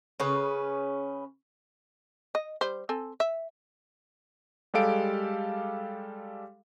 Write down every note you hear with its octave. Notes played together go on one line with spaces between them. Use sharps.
C#3 C#4 B4
D#5
G3 C5
C4 A4 G#5
E5
G3 G#3 G4 A4 F5 D7